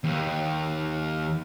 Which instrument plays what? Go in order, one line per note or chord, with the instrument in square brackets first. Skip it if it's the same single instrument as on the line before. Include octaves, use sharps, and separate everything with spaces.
[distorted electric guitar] D#2